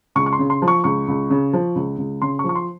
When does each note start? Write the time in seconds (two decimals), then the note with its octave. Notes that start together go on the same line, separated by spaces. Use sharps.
0.15 C#2 C#6
0.26 C#6
0.33 C6
0.39 C#3
0.50 C6
0.62 F3
0.68 C#6
0.84 C#2 C#6
1.08 C#2
1.30 C#3
1.53 F3
1.75 C#2
1.98 C#2
2.22 C#3 C6
2.39 C#6
2.44 F3
2.49 C#6
2.55 C6